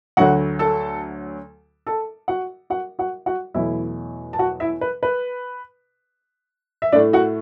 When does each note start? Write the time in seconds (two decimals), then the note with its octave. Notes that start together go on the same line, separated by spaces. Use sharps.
0.17 D2 D3 F#3 F#4 F#5
0.59 A4 A5
1.87 A4 A5
2.28 F#4 F#5
2.70 F#4 F#5
2.99 F#4 F#5
3.26 F#4 F#5
3.54 E2 B2 F#3 A3 E4 E5
4.33 A5
4.39 F#4 F#5
4.60 E4 E5
4.81 B4
5.03 B4
6.82 E5
6.92 A2 A3 D4 D5
7.13 F#4 F#5